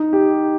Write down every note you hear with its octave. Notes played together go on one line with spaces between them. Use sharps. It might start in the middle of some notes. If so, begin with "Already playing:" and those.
Already playing: D#4
G4